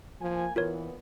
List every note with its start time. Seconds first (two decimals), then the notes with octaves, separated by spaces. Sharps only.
0.21 F3 A#3 G#5
0.56 A#2 E3 B3 F4 A#4 C#5